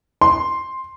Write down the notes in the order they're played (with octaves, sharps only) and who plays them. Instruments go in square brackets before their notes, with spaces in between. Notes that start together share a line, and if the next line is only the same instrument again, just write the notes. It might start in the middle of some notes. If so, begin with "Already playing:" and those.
[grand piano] C6